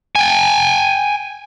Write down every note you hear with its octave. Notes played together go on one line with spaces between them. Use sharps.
G5 G#5